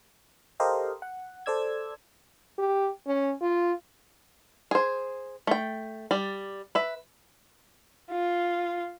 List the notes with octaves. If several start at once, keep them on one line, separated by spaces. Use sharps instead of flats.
G4 A4 A#4 C5 D#5 F5
F#5
A4 C5 D5 E6 G#6
G4
C#4
F4
G#4 C5
A3 G5
G3 D5
B4 E5
F4